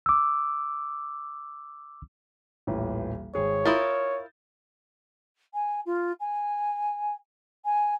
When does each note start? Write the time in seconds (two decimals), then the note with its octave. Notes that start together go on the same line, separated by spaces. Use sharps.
0.06 D6 E6
2.67 D#1 A1 E3
3.35 G#1 G#4 C#5
3.65 E4 F4 A#4 D#6 G6 A6
5.54 G#5
5.86 F4
6.20 G#5
7.65 G#5